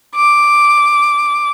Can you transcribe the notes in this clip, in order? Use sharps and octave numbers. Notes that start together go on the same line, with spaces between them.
D6